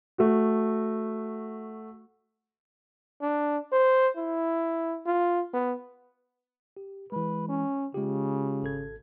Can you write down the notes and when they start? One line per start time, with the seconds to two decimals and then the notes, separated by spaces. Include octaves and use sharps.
0.18 A3 F#4
3.22 D4
3.72 C5
4.17 E4
5.06 F4
5.54 B3
6.77 G4
7.12 E3 G#3 B4
7.48 C#4
7.94 C#3 G#3 F4 G4
8.63 G#1 A4 G#6